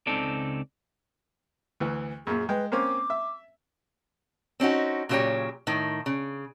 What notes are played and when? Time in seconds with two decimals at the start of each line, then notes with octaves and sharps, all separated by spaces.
0.07 C#2 C#3 C4 D#4 A4 D5
1.80 D2 E3
2.27 F#2 A#2 G#4
2.49 G#3 B4 G5
2.72 A#3 C4 C#4 D6
3.10 E5
4.60 C4 C#4 D#4 F#4
5.09 A#2 C#3 F#3 A3 G4 C#5
5.67 A2 D#3
6.06 C#3